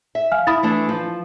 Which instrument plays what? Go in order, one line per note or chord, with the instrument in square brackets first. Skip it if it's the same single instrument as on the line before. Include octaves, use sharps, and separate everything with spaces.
[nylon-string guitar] E5
[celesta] F5 G#5 F6
[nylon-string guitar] E4 [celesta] B5 D#6 A6
[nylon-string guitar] E3 A3 D4
F3